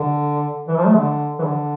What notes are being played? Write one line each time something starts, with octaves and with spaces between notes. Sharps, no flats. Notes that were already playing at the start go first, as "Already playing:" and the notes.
Already playing: D3
E3
F3
A3
D3
E3
D3